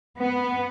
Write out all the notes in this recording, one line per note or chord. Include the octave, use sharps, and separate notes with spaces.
B3